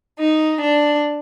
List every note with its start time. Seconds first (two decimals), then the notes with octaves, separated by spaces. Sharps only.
0.19 D#4
0.61 D4